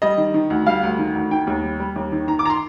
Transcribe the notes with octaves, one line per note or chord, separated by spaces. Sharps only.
G3 D#5
D#3
D#3
D2
G3 F5
D2
D#3
D2
D#3 G5
D#2
G3
G3
D#2
D#3
D#3 A#5
D6
A#5
C6